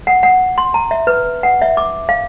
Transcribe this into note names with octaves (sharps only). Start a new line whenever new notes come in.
F#5
F#5
C6
A#5
E5
B4
F#5
E5
D6
F5